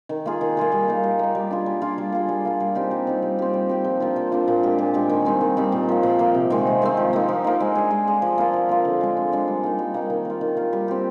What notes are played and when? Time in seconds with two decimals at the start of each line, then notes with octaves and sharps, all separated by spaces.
0.09 D#3
0.26 A#3 F4 G#4
0.41 D#3
0.57 A#3 F4 G#4
0.72 G3
0.88 A#3 D#4
1.03 G3
1.19 A#3 D#4
1.35 G3
1.51 D4 F4 G#4
1.66 G3
1.82 D4 F4 G#4
1.98 G3
2.12 A#3 F4 G#4
2.29 G3
2.45 A#3 F4 G#4
2.60 G3
2.75 C4 D#4 G4
2.91 G3
3.07 C4 D#4 G4
3.22 G3
3.39 C4 G4
3.54 G3
3.69 C4 G4
3.84 F3
4.00 A#3 D4 F4
4.16 F3
4.32 A#3 D4 F4
4.48 A#2
4.63 G#3 D4 G4
4.79 A#2
4.94 G#3 D4 G4
5.10 D#3
5.25 G3 C4 D#4
5.41 D#3
5.57 G3 C4 D#4
5.72 A#2
5.89 F3 A#3
6.03 A#2
6.19 F3 A#3
6.34 C3
6.50 D#3 G#3 C4
6.67 C3
6.82 D#3 G#3 C4
6.97 F3
7.13 A#3 D#4
7.28 F3
7.44 A#3 D#4
7.60 G#3
7.75 D4 G#4
7.91 G#3
8.07 D4 G#4
8.22 F3
8.38 A#3 F4
8.53 F3
8.69 A#3 F4
8.85 D3
9.01 G#3 D4
9.17 D3
9.32 G#3 D4
9.48 G3
9.63 A#3 D#4
9.79 G3
9.94 A#3 D#4
10.10 D#3
10.25 A#3 F4
10.41 D#3
10.57 A#3 F4
10.73 G3
10.88 C4 G4